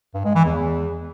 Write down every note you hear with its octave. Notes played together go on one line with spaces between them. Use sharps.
G2
G#3
E3
E2